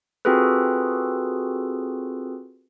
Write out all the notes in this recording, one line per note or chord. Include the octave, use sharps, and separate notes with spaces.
C4 F4 F#4 G#4 A4 B4